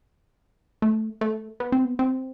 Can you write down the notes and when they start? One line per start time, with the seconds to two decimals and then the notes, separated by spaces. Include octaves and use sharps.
0.82 A3
1.21 A3
1.60 B3
1.72 C4
1.85 B3
1.99 C4